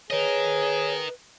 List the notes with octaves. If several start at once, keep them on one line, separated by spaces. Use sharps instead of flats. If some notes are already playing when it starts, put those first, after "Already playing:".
G#4 A#4 B4 C#5 D#5